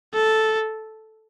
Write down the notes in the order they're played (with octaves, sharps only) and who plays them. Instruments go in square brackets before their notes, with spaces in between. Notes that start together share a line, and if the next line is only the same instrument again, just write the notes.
[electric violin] A4